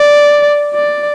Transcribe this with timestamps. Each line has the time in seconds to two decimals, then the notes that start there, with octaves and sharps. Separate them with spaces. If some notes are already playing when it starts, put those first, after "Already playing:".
Already playing: D5
0.74 D5